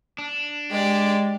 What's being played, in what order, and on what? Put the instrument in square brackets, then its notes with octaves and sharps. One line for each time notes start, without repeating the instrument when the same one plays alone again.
[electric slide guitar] D4
[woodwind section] G#3 [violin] G4 D5